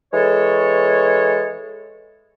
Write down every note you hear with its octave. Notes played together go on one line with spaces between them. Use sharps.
E3 G#3 A4 C#5